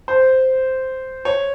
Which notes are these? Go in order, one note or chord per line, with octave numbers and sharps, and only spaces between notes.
C5
C#5